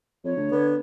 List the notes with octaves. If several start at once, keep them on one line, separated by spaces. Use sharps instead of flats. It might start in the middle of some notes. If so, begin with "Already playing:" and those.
F2 C#5
D2
D3 B3